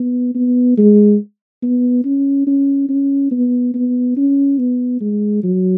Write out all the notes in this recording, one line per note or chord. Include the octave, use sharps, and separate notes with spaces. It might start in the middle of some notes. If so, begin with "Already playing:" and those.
Already playing: B3
B3
G#3
B3
C#4
C#4
C#4
B3
B3
C#4
B3
G#3
F#3